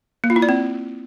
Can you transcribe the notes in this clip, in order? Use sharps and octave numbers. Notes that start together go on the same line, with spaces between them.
A#3
F4
E4
D5
C4